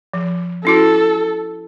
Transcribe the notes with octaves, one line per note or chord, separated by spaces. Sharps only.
F3
C#4 E4 F#4 A4